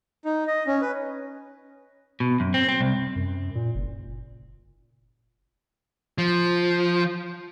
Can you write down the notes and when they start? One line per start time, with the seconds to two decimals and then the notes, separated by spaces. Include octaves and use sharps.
0.25 D#4
0.48 D#5
0.67 C#4
0.82 B4
2.20 B2
2.40 F#2
2.54 C4
2.69 C4
2.81 C2
3.16 F#2
3.55 A#2
3.75 F#1
6.18 F3